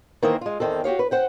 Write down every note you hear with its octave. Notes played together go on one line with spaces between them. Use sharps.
D#3 E3 A#3 C5 D#5 E5
G#3 F4
E2 G#2 D#3 C4 A4
F#4 G4 C#5 F5
B4
C5 F#5 G5